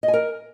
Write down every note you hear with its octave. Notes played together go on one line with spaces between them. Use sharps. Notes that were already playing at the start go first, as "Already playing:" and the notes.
D#5
G#5
A#4